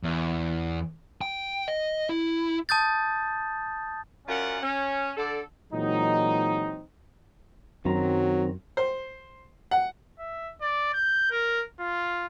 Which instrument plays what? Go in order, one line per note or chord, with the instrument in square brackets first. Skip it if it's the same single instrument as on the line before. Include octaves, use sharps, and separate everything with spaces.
[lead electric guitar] E2
G5
D#5
E4
[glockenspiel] A5 D#6 G6 A6
[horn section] F#2 C#4 F4 A#4 D5 F#5
C#4
D3 A4 D5
[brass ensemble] A#2 E3 F#3 G#3 C4 D#4
[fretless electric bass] F#2 [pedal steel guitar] D#3 C4 A#5 [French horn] F#3
[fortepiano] C5
F#5
[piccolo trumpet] E5
D5
G6
A#4
F4